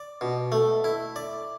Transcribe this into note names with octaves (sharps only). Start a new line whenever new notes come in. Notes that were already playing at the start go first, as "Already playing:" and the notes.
Already playing: D5
B2
A3
E4
D5